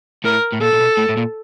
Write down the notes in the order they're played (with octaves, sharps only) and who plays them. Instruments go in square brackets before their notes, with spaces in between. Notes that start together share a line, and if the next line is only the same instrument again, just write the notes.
[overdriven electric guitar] A2 [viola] A#4
[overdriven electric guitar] A2
[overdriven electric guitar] A#2 [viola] A4
[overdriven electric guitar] A#2
B2
A2
A2
A#2